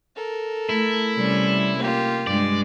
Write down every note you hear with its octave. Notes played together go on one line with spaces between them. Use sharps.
A4 A#4
A3 E4
C3 G3 C#4
A#3 F4 G4
G2 G#3 D5